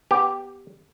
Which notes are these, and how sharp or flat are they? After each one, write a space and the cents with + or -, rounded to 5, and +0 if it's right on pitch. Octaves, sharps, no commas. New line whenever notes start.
B3 +0 G4 +0